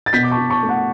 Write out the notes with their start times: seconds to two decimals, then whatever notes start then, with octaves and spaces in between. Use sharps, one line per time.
0.06 A6
0.13 B2 G6 B6
0.23 D6
0.31 A5 C#6
0.37 B2
0.50 A5 C#6
0.63 A3
0.69 F#5